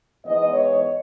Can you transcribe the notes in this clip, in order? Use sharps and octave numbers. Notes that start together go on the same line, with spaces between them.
G#2 E3 B3 D#5
C#5